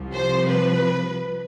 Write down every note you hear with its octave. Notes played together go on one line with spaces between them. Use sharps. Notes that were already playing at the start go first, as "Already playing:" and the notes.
Already playing: C2 C3 F3
C5
B4